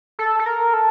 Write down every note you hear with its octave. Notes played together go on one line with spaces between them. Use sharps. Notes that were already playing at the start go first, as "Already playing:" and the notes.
A4
A4
A#4
A4